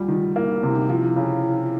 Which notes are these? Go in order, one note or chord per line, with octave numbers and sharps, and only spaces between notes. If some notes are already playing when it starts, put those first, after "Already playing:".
Already playing: D2 G3 F4
D#3
A#3 E4
D#4
C3 E4
D#4
F3 E4
C#3